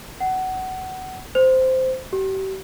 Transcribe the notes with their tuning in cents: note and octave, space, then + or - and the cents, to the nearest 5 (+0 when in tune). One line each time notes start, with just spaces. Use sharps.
F#5 +20
C5 -10
G4 -40